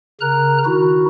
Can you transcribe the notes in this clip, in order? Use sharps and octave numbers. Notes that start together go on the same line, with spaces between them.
C#3 A#4 A#5 F#6
D#3 D#4 E4 F#4